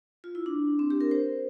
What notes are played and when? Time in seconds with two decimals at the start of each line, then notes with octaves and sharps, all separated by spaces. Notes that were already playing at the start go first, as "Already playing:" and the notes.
0.24 F4
0.35 E4
0.46 D4
0.79 C4
0.90 G4
1.01 A#4
1.11 C5